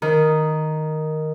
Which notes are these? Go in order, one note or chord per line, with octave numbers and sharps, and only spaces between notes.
D#3